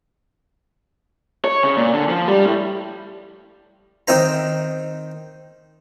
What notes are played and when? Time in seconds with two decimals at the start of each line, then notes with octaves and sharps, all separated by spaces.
1.45 C#5
1.63 C#3
1.77 A#2
1.94 D3
2.09 F3
2.28 G3
2.45 A2
4.08 D#3 C4 D#4 C5 A#5